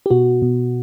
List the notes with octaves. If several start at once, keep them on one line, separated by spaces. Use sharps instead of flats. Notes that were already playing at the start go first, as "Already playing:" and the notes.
G4
B2 F#4
B2